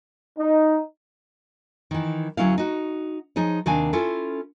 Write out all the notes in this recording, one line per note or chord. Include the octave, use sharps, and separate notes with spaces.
D#4
D#3 E3
D2 F#3 C#4 E4 F5
D#4 F#4
F3 D#4 G#4 C#5
D#2 C3 D#3 D4 F5 G#5
C#4 E4 F4 A4